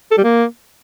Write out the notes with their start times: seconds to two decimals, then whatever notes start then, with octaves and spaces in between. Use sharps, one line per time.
0.11 A4
0.18 G3
0.24 A#3